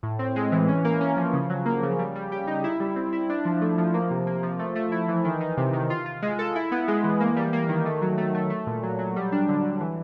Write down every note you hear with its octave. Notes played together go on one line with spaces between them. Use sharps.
A2
C4
G#3
E3
C#4
A#3
C#4
F3
C#3
F#3
A#3
C#3
G3
G3
G4
D#4
E4
G3
C4
E4
D4
F3
A3
F3
A#3
C3
A#3
F3
A3
A3
E4
E3
D#3
D#3
C3
D#3
F4
F4
G#3
A4
E4
B3
G#3
E3
A#3
G3
A#3
D#3
A3
F#3
A3
A3
A3
A#2
F#3
F#3
G3
D4
D3
D3
E3